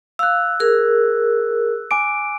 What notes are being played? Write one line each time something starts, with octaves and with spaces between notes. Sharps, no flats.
F5 E6 F#6
G#4 A#4
G#5 D6 D7